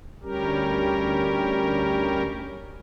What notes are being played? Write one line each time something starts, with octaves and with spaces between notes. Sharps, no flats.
D2 G3 C#4 G4 A#4